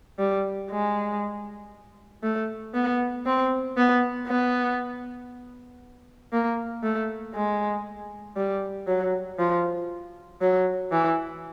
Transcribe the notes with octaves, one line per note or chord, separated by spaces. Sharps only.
G3
G#3
A3
B3
C4
B3
B3
A#3
A3
G#3
G3
F#3
F3
F#3
E3